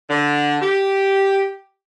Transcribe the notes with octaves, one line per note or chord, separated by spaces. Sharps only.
D3
G4